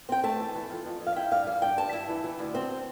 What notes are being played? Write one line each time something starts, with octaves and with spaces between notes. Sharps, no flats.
C4 G5
A3 A5
E3
E3
F2
F2
F2
F5
E4 G5
G2 F5
E3 F5
G2 G5
G2 A5
E4
E3
E3
D2
C4